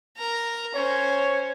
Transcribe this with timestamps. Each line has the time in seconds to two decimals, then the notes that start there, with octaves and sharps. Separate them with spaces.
0.17 A#4 A#5
0.75 C#4 C5 C#5